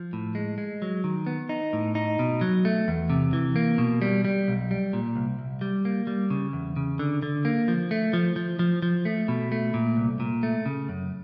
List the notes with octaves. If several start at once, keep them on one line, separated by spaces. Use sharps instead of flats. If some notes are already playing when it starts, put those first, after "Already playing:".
Already playing: F3
A2
G#3
G#3
F#3
D#3
B3
D#4
A2
D#4
B2
F#3
A3
E2
C3
E3
A#3
B2
G3
G3
B1
G3
A#2
C2
C2
G3
A#3
G3
C#3
E2
C#3
D3
D3
A#3
F3
A3
F3
F3
F3
F3
A3
B2
A3
A#2
C2
A#2
A3
C#3
F#2